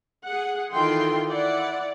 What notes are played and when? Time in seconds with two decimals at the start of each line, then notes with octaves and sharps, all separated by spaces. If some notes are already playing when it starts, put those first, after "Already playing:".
0.25 G#4 F#5
0.71 D#3 E3 F4 A4 G5 C6
1.29 E4 D5 F#5